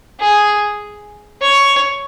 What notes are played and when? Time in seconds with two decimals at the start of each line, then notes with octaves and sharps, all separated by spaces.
0.20 G#4
1.42 C#5